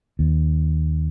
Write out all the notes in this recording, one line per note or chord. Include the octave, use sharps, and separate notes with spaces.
D#2